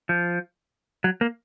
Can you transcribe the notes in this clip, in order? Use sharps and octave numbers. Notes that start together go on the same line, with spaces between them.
F3
F#3
A#3